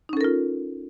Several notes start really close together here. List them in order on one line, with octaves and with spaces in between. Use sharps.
D#4 C#4 A4 A#4 F4